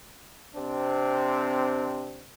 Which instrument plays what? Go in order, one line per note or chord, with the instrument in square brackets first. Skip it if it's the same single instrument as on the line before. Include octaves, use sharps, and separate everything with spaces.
[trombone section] C3 C4 D4